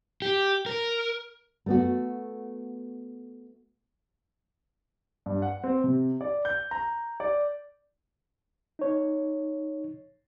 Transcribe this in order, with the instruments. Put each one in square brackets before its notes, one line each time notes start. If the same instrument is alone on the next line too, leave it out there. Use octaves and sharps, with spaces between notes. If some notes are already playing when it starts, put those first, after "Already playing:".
[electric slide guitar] G4
A#4
[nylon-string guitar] A3 B3 F#4
[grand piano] G2
F#5
C4
C3
D5
G6
A#5
D5
[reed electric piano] D#4 C#5